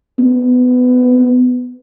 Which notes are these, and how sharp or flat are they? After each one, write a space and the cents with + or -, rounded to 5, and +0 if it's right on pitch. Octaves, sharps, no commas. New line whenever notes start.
B3 +20